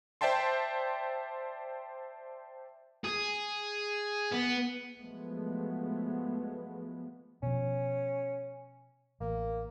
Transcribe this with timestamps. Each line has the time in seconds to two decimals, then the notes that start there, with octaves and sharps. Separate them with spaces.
0.21 C5 D5 E5 G5 A5 C6
3.04 G#4
4.32 B3
4.99 F3 F#3 G#3 A3 B3
7.43 B2 F3 C#4
9.20 A1 A#3